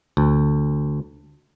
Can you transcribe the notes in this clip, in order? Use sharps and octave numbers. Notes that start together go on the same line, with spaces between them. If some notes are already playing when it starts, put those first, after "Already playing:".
D2